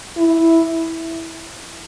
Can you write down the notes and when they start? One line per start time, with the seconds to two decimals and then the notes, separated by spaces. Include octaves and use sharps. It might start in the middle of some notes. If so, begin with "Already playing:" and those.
0.17 E4